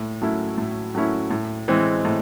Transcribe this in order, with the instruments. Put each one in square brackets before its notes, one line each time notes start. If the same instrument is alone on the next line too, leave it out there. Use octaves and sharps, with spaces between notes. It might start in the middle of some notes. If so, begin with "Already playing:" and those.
Already playing: [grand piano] A2
F#3 A3 C#4 E4
A2
F#3 A3 C#4 E4
A2
E3 G#3 C4
A2